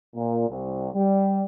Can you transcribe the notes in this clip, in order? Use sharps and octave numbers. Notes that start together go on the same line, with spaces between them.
A#2
C2
G3